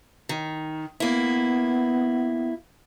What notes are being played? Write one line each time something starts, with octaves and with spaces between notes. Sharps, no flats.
D#3
A#3 B3 E4